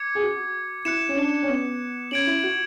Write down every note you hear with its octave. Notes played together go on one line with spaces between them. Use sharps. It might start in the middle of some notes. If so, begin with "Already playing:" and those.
Already playing: D6 G#6 C#7
G#4
F#4
E4 F#6 C#7 E7
C#4
D4
C#4
B3
C#4 G#6 D7 F#7
E4
F#4